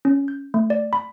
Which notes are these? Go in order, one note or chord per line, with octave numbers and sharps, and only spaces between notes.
C#4
G6
A3
D5
B5